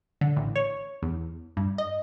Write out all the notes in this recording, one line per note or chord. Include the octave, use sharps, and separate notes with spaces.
D3
A1
C#5
E2
G2
D#5